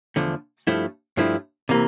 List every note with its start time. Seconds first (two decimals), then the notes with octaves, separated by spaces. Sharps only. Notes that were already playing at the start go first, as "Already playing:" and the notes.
0.16 E2 D3 F3 A3
0.67 G2 F3 A3 E4
1.17 G2 F3 A3 E4
1.69 C3 E3 A#3